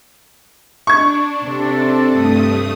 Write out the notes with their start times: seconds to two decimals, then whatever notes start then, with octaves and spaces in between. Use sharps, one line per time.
0.87 D4 C#6 G#6
1.44 C3 A4
2.11 G2 A3 D#6